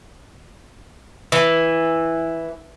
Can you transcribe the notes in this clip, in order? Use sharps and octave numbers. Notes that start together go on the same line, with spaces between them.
E3